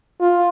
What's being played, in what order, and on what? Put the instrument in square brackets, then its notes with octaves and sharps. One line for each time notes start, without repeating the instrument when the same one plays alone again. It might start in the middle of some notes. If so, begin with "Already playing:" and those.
[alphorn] F4